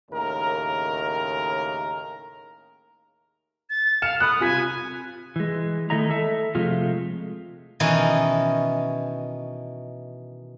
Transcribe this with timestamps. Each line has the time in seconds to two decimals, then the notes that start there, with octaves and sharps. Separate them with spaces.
0.11 D#2 A2 C#3 A#4
3.70 A6
4.02 F5 F6 C#7 E7
4.20 B5 D#6 F#6
4.40 C3 F4 G#5 B6
5.36 E3 G#3
5.90 D#3 A3 E4 D#5 E5 A#5
6.10 A4 E5
6.55 C3 F3 G#3 A3 F4
7.80 B2 D#3 E3 C#4 D#4